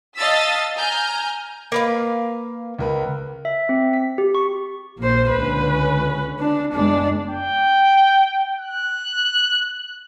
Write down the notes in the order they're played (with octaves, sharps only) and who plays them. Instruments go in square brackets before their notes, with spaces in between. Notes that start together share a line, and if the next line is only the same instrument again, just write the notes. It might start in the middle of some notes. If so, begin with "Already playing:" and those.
[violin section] D#5 F5 A5 E6 A6 B6
G#5 A#5 F6 G6
[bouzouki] A#3 B4 F5
[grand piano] C#2 A#4 B4
[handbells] E5
C4
B6
G4
C#6
[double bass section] A#1 [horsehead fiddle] A#3 C5
[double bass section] C#2 D3 C#4 [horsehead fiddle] B4
[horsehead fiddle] D4
[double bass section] F#1 G#3 B3 [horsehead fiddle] D4 D5
[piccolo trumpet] G5
F#6